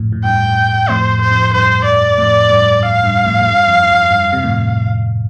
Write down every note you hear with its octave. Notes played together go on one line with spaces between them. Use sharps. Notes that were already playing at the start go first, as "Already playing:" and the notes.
Already playing: F2 A2
A2
G2 G5
F2 A2 C5
C5
F2
G2 C5
D5
F2 A2
G2
F2 F5
G2
F2 A2
A2
G2
F2
F2
G2
C3
F2 A2